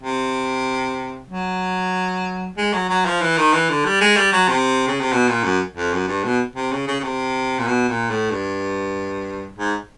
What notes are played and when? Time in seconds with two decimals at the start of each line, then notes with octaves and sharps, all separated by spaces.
0.03 C3
1.30 F#3
2.58 G#3
2.73 F#3
2.90 F#3
3.06 F3
3.21 E3
3.38 D#3
3.53 E3
3.70 D3
3.85 G3
4.01 G#3
4.17 G3
4.33 F#3
4.49 C3
4.88 C#3
5.00 C3
5.13 B2
5.29 A#2
5.44 F#2
5.76 F2
5.93 F#2
6.08 G2
6.24 B2
6.56 C3
6.72 C#3
6.88 C#3
7.00 C#3
7.04 C3
7.59 A#2
7.67 B2
7.89 A#2
8.10 A2
8.31 G2
9.59 G#2